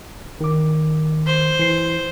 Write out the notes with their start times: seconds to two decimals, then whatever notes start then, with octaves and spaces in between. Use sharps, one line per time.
0.41 D#3 D6
1.27 C5
1.59 E3 C7